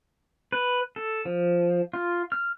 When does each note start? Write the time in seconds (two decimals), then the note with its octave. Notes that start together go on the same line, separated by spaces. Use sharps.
0.52 B4
0.96 A4
1.25 F3
1.93 F4
2.32 F6